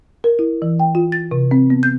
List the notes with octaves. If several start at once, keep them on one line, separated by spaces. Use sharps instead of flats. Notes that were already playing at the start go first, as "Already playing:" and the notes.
A#4
E4
E3
G5
F4
A6
C3
C4
B3
G6